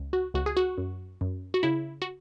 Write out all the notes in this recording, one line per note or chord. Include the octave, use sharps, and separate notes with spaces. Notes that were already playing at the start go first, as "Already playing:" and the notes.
Already playing: C#2
F#4
C#2 F#4
G#4
F#4
F#2
F#2
F#4
C#3 E4
F#4